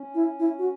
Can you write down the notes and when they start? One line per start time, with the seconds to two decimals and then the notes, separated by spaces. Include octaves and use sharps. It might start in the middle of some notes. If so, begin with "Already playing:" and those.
Already playing: C#4
0.15 E4
0.39 E4
0.58 F#4